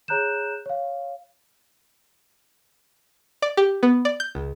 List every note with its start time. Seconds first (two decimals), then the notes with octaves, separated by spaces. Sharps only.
0.08 G#4 C#5 A#5 F#6 G6 E7
0.66 C#5 F5
3.42 D5
3.57 G4
3.83 B3
4.05 D5
4.20 G6
4.35 C#2